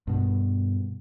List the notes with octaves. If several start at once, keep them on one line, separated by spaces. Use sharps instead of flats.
G2 B2